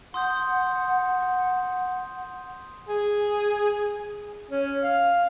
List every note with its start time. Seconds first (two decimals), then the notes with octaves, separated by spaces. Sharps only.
0.14 F#5 C6 D#6 G6
2.89 G#4
4.51 C#4
4.84 F5